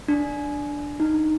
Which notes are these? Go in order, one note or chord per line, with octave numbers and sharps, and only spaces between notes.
D4
D#4